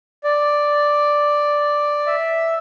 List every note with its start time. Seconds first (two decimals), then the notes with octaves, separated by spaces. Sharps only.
0.24 D5
2.07 E5